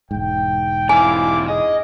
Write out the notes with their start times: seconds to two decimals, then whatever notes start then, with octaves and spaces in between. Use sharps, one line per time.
0.11 E1 G#2 G5
0.89 C3 E3 E4 F5 G#5 D6
1.48 G#4 D#5